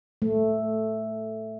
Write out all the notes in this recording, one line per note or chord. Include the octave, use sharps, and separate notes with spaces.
A3